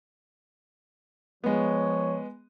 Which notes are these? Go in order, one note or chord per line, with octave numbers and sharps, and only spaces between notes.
F3 G#3 B3 C#5